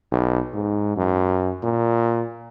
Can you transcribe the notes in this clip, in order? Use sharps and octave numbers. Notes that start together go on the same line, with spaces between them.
B1
G#2
F#2
A#2